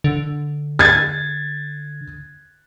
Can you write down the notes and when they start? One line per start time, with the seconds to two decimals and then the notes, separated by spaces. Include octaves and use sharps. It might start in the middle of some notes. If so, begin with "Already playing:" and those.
0.04 D3
0.79 G#6 A6